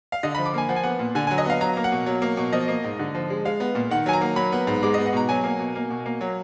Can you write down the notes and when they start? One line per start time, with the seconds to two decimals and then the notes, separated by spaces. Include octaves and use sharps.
0.12 F5
0.23 D3 D#5
0.35 F3 B5
0.45 D6
0.54 A#3 G#5
0.69 F3 F#5
0.76 G#5
0.84 B3 F#5
0.99 A#2
1.15 D3 G#5
1.27 F#3 G#5
1.38 D#5
1.46 B3 F5
1.61 F#3 A#5
1.77 A#3
1.84 F#5
1.92 B2
2.06 F#3
2.22 A#3
2.37 B2
2.52 F3 D#5
2.68 A#3
2.84 G#2
2.99 D3
3.15 F3
3.30 G#3
3.45 G#3 F5
3.60 B3
3.75 A#2
3.90 D#3 F#5
4.06 F#3 G#5
4.13 A#5
4.21 A#3
4.36 F#3 B5
4.52 B3
4.67 G#2
4.83 G#3 D6
4.94 B3 D#5
5.06 F#5
5.13 B2 A#5
5.29 F#3 G#5
5.44 A#3
5.59 B2
5.75 A#3
5.90 B2
6.06 A#3
6.21 F#3